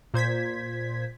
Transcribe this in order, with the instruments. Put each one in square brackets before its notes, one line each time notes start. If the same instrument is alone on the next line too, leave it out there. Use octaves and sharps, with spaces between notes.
[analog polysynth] A#2 C5 G#6 B6